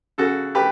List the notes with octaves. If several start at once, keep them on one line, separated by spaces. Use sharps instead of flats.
C#3 F#4 A4
A3 G4 B4